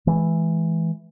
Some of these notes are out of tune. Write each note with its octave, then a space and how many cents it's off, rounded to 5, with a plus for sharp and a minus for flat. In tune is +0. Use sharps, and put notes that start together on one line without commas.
E3 +0 G#3 +30